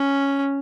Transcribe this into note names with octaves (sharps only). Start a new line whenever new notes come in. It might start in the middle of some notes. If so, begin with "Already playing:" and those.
Already playing: C#4